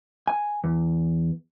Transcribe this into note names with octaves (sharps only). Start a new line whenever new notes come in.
G#5
E2